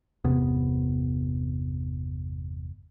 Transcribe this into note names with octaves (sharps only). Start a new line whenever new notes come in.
G1 E2 C3 B3